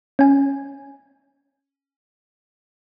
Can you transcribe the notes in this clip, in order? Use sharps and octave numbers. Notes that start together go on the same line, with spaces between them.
C#4 G#5